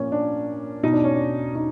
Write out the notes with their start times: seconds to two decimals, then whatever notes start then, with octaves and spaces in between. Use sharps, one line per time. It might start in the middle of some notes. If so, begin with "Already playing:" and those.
Already playing: A#2 F3 A#3 C#4
0.12 D4
0.84 B2 D#4
0.93 D4
1.04 C#4
1.14 D4
1.55 D#4